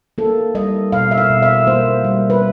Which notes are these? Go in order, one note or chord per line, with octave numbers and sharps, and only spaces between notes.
A#3 A4
G3 D#5
B2 F5
E5
F5
B2
E5
A#3 C5
G3
B4